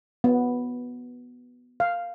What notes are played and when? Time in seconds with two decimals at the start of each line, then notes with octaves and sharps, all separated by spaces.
0.24 B3
1.80 F5